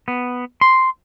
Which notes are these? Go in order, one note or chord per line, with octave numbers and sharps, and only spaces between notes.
B3
C6